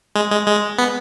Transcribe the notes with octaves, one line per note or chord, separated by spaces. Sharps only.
G#3
G#3
G#3
B3